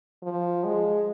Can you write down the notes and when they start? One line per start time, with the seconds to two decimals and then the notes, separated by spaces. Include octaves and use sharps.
0.23 F3
0.64 G#3